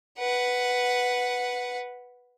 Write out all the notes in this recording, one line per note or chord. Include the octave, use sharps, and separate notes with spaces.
B4 F#5